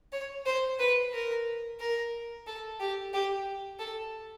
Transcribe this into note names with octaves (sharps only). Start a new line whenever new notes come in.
C#5
C5
B4
A#4
A#4
A4
G4
G4
A4